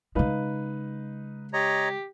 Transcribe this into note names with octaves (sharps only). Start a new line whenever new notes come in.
C#3 G#3 D#4 B4 F5
G4 C#5 D#5 A#5